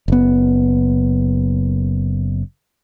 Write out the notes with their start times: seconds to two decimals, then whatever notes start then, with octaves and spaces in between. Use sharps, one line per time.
0.08 F#1 B3